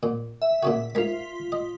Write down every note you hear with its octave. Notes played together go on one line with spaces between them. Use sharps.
A#2
E5
A#2 C#3 F#4
G#2 F4 A#4 B6
D#5